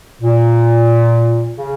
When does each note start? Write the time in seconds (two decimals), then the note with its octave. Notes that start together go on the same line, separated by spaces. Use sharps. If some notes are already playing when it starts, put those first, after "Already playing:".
0.22 A#2
1.57 C#3